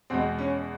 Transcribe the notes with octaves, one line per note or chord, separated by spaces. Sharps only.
E2 B2 G#3 C4
C#4